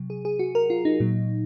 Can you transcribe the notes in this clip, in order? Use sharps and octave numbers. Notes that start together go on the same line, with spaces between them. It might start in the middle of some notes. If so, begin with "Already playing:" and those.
Already playing: C3 F#3
G#4
G#4
F#4
A#4
F4
D#4
A#2 F#3